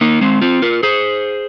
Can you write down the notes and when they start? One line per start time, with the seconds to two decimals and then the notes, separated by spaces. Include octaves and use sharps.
0.01 A#3 D#4
0.21 G#3 C4
0.41 C4 F4
0.62 F4 A#4
0.83 G#4 C5